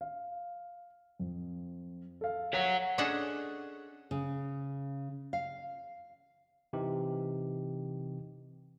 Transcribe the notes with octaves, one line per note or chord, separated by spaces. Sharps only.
F5
F2
A4 F5
C#5 F#5 B6
C#4 D4 G#4 A4 D#5 F#5
C#3
F5
C3 E3 C4 D#4 G4